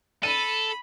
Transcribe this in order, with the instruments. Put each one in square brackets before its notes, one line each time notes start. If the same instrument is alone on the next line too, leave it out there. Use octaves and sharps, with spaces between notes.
[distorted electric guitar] A4 [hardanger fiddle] B5 [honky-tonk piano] D#7